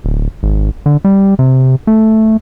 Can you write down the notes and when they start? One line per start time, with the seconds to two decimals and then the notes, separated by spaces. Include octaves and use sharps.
0.04 D1
0.43 G#1
0.86 D3
1.05 G3
1.39 C3
1.87 A3